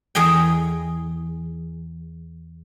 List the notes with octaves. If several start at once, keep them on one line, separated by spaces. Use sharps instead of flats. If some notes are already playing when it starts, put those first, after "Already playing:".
E2 G#4 D#5 G5